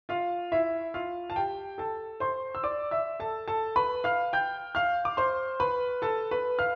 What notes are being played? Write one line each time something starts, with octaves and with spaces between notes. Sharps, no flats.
F4 F5
E4 E5
F4 F5
A5
G4 G5
A4 A5
C5 C6
E6
D5 D6
E5 E6
A4 A5
A4 A5
B4 B5
F5 F6
G5 G6
F5 F6
D6
C5 C6
B4 B5
A4 A5
B4 B5
F5 F6